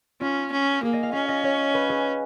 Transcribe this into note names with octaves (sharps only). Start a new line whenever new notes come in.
C#4 F4
C#4
A#3 G#4
D#5
F5
C#4 F5
D#5
C#5
B4
G#4